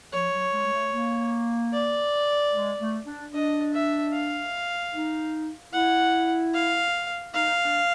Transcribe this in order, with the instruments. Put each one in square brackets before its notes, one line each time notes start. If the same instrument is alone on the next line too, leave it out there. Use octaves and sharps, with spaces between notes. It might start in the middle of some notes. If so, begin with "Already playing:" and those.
[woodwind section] F3 [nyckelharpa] C#5
[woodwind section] F#3
G#3
G#3
A3
A#3
[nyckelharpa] D5
[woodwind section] G#3
A3
D4
[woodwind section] D4 [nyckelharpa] D#5
[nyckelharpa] E5
F5
[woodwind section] D#4
[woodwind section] E4 [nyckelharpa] F#5
[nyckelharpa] F5
[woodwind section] D#4 [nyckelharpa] F5
[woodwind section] D4